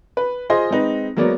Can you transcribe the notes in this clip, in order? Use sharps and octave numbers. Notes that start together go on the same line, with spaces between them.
B4
F4 G#4 C5 D#5 C6
G#3 C4 D#4 B4
F#3 G#3 A#3 B3 D5